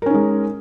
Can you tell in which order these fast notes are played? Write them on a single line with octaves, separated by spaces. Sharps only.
A#4 C#4 D#4 G#3